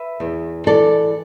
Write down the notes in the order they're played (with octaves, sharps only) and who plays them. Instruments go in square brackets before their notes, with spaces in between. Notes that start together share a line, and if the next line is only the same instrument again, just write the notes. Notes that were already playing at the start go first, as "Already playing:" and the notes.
Already playing: [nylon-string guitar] B4 E5
E2
E3 A4 D5